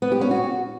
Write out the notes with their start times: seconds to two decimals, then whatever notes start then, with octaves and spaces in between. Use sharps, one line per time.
0.02 B3
0.12 G4
0.21 C#4
0.31 F#4